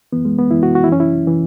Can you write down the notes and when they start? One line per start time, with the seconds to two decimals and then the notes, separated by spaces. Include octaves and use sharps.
0.13 F#2 E3 B3
0.25 G#3
0.39 B3
0.51 F#2 E3 E4
0.63 F#4
0.75 F#4
0.84 E4
0.88 F#2 E3 C#4
1.00 E4
1.27 E3